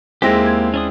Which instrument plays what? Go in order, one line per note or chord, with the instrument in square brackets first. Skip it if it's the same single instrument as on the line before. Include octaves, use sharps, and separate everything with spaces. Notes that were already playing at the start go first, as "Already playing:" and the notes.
[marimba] D#2 G#4 A#6 [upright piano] G#3 C4 E4 [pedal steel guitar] A#3 G4
[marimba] G#6
[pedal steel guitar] C#4 D4 D#6